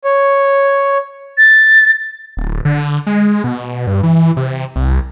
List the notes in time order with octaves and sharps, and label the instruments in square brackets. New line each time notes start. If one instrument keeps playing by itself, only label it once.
[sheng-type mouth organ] C#5
[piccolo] A6
[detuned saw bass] D1
D3
G#3
B2
G2
E3
C3
C2